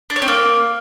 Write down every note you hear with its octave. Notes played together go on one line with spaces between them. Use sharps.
D4
C#5
C4
A#3